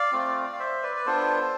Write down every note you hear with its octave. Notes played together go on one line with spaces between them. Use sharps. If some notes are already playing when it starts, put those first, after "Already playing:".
Already playing: D5 F5
A3 C4 F4
F5
C5 E5
B4 D5
B4
B3 D4 F4 A4 C5